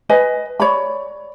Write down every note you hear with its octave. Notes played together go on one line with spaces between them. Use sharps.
B4 D#5 G#5
C#5 D5 B5